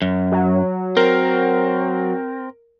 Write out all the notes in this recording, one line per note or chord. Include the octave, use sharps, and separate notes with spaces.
F#2
F#3
C4 A#4